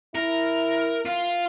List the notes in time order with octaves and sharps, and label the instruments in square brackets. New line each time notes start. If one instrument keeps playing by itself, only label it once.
[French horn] E4 [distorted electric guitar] A#4
[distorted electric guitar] F4